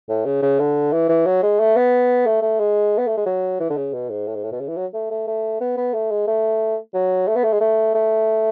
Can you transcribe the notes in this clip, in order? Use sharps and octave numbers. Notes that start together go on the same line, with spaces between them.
A2
C#3
C#3
D3
E3
E3
F#3
G#3
A3
B3
A3
A3
G#3
B3
A3
G#3
F#3
E3
D3
C#3
B2
G#2
A2
G#2
A2
B2
C#3
E3
F#3
A3
A3
A3
B3
B3
A3
G#3
A3
F#3
A3
B3
A3
G#3
A3
A3